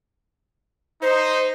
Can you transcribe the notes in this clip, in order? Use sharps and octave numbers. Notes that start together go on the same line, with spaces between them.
D#4 C5